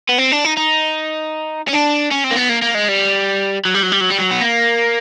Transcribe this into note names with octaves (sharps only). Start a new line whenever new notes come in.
B3
C4
D4
D#4
D#4
C#4
D4
C#4
C4
A#3
B3
A#3
A#3
G#3
G3
F#3
G3
F#3
G3
F#3
G3
F#3
B3
A#3